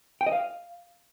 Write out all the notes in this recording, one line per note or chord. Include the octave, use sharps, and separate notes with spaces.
G5
D#5
F5